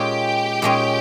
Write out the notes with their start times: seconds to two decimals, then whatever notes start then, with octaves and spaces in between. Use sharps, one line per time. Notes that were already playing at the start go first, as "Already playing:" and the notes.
Already playing: A#2 G#3 C#4 G4 G5
0.62 A#2 G#3 C#4